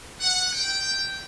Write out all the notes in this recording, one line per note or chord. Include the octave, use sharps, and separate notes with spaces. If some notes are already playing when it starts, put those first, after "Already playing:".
F#5
G5